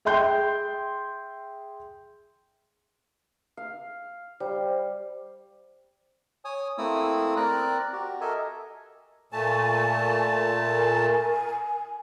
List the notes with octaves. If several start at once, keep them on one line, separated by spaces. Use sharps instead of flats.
G#4 E5 G5 C6 G6
F5
G3 C5
C#5 G#5 D#6
A3 A#3 C4 E4 D#6 E6
C4 A#4 D5 A#5 F#6
F#4 G4
A4 A#4 D#5 E5 G#5
A#2 A3 G#5 A5 C#6
A#4 G#5